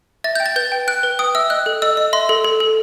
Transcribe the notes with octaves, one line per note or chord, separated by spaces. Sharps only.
E5 A6
G5 G6
A6
B4 G6
G5
G5 F#6
B4
G5 D#6
E5 E6
D#5 F#6
A4
D#5 E6
D#5
E5 C6
A4
A4
A4